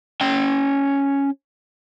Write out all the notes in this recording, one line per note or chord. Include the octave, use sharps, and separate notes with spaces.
C#4 G5